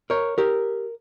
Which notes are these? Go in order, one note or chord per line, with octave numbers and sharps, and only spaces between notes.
A#4 C#5
G4 A#4